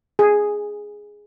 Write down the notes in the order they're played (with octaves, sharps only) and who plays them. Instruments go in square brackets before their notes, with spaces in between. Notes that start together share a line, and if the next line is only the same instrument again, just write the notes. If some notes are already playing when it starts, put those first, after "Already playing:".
[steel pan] G#4